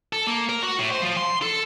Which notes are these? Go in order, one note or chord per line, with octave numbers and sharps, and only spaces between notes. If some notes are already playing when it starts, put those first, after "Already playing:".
A4
A#3
A#4
F#4
A2
C5
F3
C6
A4